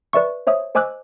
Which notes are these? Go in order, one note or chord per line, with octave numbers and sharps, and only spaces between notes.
B4 D5 E5 C#6
C5 C#5 E5 D#6
C5 D#5 G#5 D6 E6 F#6